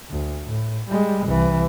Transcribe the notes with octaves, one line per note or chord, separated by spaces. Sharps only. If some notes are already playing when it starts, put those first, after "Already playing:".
D2
A2
G3 G#3
C2 E3